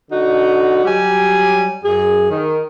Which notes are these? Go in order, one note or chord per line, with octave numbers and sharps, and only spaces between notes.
D3 D#4 F#4
F#3 G3 G4 G#5
F#2 G#4
D#3